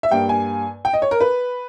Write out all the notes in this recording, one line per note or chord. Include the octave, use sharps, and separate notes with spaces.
E5
G2 G3 A#3 G5
G#5
G5
D#5
C#5
A#4
B4